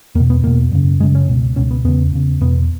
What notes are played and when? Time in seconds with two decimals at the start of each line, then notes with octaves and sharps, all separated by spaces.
0.15 E2 A#3
0.20 B2
0.30 B3
0.43 E2 B2 A#3
0.72 F#2 C#3
1.00 F#2 G#3
1.03 C#3
1.15 C#4
1.29 C#2 B2
1.56 C#2 B2 C#4
1.71 B3
1.84 E2 C#3 B3
2.13 E2 C#3
2.41 E2 B2 B3